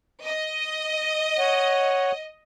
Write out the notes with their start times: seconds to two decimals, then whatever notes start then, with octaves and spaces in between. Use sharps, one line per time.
0.24 D#5
1.39 C#5 F#5